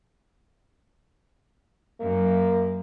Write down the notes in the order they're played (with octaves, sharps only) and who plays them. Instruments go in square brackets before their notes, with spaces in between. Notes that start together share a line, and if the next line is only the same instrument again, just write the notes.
[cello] F#2 [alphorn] A#3